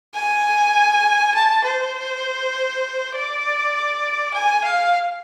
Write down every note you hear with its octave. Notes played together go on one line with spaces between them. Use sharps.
G#5
A5
C5
D5
G#5
F5